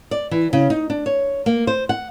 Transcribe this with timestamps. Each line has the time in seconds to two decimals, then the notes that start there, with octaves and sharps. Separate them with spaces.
0.11 D5
0.31 E3
0.53 C#3
0.70 D#4
0.90 D4
1.06 C#5
1.46 A#3
1.67 C5
1.89 F#5